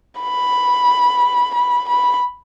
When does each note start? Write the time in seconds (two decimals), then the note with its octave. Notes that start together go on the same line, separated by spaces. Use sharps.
0.21 B5
1.54 B5
1.89 B5